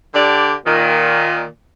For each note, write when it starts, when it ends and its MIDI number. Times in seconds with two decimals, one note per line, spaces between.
0.14 0.54 50
0.14 0.54 67
0.14 0.54 74
0.66 1.46 46
0.66 1.46 51